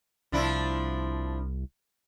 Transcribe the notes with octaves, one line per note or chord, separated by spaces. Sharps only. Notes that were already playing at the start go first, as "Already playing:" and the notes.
C2 F3 D4 E4